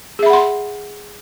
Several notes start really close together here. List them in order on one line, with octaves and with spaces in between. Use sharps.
G#4 E5 B5 F#5 C6